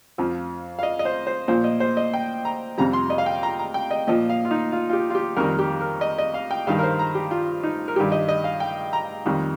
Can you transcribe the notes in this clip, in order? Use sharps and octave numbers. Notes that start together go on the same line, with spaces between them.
F2 F3
F5
D#5
D#5
C5
C5
A#2 F3 C5
D#5
C5
D#5
G5
A#5
F2 C3 G3 A#5
C6
D#5
F5
G5
A#5
A#5
G5
D#5
A#2 F3 D#5
F5
F4
D#4
F4
F4
G4
F4
G4
F2 D#3 G3 A#4
G4
A#4
D#5
D#5
F5
G5
G2 D#3 G3 F5
A#4
C5
A#5
G4
F4
D#4
A#4
G2 D#3 G3 G4
D#5
D#5
F5
G5
A#5
F2 D#3 G3